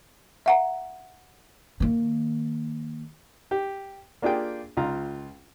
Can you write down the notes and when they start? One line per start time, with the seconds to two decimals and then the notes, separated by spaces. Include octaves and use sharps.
0.46 E5 F#5 A#5
1.80 D#3 A#3
3.51 G4
4.22 A#3 D4 F4 G4 G#4 G5
4.77 C#2 F4 A#5